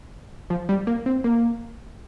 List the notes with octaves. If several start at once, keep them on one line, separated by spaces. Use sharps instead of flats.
F3
G3
A#3
C4
A#3